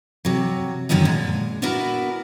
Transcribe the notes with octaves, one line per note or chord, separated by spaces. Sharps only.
C3 F#3
F#2 D3 D#3 F#3 B3 D#5
A#2 G#3
B3 D4 E4 F#4 A#4 B4